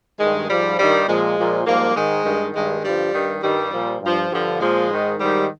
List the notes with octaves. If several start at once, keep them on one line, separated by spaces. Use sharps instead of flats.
G2 D#3 G#3
G#2 F3 G3
G2 D#3 G3
A#2 F3 G#3
A#2 F3
G#2 F3 G3 A#3
G#2 D#3 G#3
G2 D#3
G2 D#3 G#3
G2 D3 F3 G3
G2 D#3
G2 D#3 G3
A#2 F3
G2 F3
G2 D3 F3
A#2 F3 G#3
G#2 D#3
G#2 D#3 G3